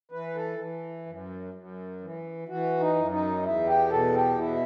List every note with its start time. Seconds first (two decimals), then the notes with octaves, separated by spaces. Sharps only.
0.11 E3 B4
0.35 A4
0.59 E3
1.06 F#2
1.54 F#2
2.01 E3
2.48 E3 F#4
2.80 D#4
2.95 F#2
3.11 D#4
3.43 E2 E4
3.67 G4
3.90 B2 A4
4.14 G4
4.38 B2 E4